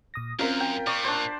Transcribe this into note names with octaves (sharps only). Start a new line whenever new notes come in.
A#2 D#6 A#6
F#2 C4 C#4 F4 A#4
G5
A#2 D5 C#6
D4 C5